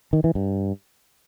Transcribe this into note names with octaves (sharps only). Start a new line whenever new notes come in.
D#3
E3
G2